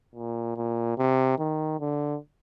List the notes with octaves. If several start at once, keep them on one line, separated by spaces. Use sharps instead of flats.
A#2
A#2
C3
D#3
D3